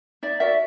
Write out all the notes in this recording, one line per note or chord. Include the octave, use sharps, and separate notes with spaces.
D#4 D5 E5
F#4 A#4 D5 E5